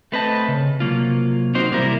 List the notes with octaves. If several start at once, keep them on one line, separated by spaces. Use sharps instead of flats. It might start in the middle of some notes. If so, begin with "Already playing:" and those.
A3 C4 B4 C5 D#5 A5
C#3
C3 F#3 A#3 F4
A#3 C4 D#4 F#4 C5
C3 E3 G3 A#3 E4 A#4